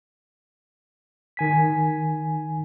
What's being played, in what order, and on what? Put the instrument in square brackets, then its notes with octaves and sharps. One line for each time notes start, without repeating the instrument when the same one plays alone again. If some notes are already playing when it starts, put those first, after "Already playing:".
[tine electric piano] D#3 G#5 B6